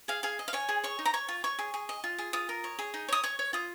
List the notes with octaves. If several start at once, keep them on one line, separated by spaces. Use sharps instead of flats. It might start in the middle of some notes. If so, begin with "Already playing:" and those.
G#4 F5
G#4 F5
D#5
F5
C#5 G#5
G#4
C#5 C#6
D#4
A#5
C#5 C#6
F4
C#5 C#6
G#4
G#4
D#5
F4
G#4
F4 D#6
A#4
C#5
G#4
D#4
C#5 D#6
C#5 C#6
C#5
F4 D#6